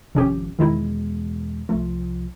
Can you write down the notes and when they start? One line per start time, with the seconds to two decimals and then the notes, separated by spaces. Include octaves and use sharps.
0.15 G#1 F2 C3 C#4 G4
0.59 E2 B2 D#3 G#3 D#4 E4
1.69 C2 F3 A3